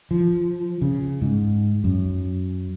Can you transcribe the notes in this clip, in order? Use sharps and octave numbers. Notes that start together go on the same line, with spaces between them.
F3
C#3
G#2
F#2